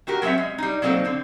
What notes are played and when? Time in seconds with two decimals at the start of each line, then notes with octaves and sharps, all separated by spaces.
0.07 A3 F#4 G4 A#4
0.22 F#3 A#3 C4 C#4 E5
0.38 G#3
0.58 G3 D#4
0.82 F#3 A#3 C4 D#4 A4
1.05 D3 C4